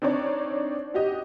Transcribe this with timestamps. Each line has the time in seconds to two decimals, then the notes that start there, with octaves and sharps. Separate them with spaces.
0.02 C4 D4 D#4 C#5 D5
0.94 F#4 G4 D#5